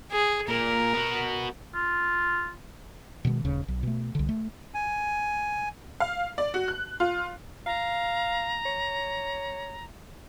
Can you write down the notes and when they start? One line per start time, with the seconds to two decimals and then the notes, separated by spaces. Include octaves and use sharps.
0.12 G#4
0.48 A#2 A#4
0.93 B3 F#4
1.74 F4
3.25 B2 D#3 G3 G#3
3.45 D#1 D#2 C#3
3.68 B1
3.83 B2 A3
4.15 C2 D3
4.29 A3
4.74 G#5
6.00 F5
6.38 D5
6.54 F#4
6.68 F#6
7.00 F4
7.66 F5 A#5
8.66 C#5